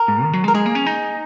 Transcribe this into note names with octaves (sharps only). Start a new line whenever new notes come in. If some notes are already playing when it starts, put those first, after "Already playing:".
Already playing: A#4
G#2
D#3
F#3
G#3
A#4
G#3 G#4
A#3
C#4
D#4